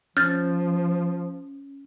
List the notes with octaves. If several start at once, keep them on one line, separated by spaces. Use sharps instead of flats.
F3 C#4 F6 G6 A6